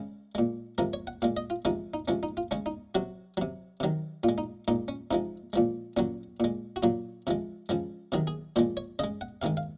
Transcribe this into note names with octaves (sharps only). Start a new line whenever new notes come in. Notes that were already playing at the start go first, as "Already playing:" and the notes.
Already playing: C#3 G#3
A#2 G#3
C3 F3 G#3 A#4
C#5
F#5
A#2 G#3 F5
D#5
F4
C3 F3 G#3 D#4
D#4
C3 F3 G#3 C#4
D#4
F4
C#3 G#3 C#4
D#4
C3 F#3 F#4
C3 F#3
C3 D#3 F#3
A#2 F4
G#3
D#4
A#2 G#3 D#4
C#4
C3 F3 G#3 D#4
A#2 F3 G#3
A#2 F#3 C#4
A#2 G#3
F#4
A#2 F#3 F4
C3 F3 G#3
C#3 F3 G#3
C3 D#3 F#3 G#4
G#4
A#2 F3 G#3 C5
C#5
C#3 G#3 D#5
F#5
C3 D#3 G#3 F5
F5